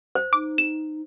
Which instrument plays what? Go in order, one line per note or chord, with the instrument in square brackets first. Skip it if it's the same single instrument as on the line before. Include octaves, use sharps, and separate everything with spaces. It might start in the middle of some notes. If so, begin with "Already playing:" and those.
[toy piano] C5
[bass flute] D#4 [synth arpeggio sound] D6
[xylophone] E7